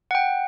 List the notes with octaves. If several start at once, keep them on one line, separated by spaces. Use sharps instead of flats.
F#5
G5